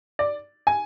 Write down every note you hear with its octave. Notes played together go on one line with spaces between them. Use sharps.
D5
G#5